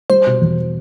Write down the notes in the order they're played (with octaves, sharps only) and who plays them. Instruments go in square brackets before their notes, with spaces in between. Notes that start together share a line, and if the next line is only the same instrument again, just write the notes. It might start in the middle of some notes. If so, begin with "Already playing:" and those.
[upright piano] G3 [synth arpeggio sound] C5
[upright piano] B2
E2